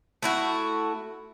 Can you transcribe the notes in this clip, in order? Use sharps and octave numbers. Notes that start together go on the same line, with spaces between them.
A3 E4 F#4